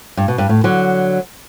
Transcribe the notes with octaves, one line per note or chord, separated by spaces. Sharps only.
G2
B2
G2
A2
D3 F#3